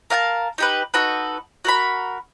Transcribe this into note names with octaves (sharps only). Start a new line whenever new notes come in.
A#4 F5 F#5 A5
D#4 G4 B4
D#4 F#4 A4 B4
F#4 A#4 B5